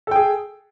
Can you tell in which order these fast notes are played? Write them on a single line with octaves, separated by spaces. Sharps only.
A4 G5 G#4